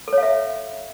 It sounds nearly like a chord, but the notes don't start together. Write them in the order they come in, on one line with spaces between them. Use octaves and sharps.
A4 C#5 F5 E5